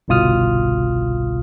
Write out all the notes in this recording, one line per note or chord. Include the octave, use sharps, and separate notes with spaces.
G1 C2 B2 F4 D#6 F6